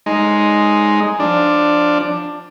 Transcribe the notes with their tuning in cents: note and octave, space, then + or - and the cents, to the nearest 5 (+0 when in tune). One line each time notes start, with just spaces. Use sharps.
G#3 +0 D#4 +0 C6 +0
F3 +0 D4 +10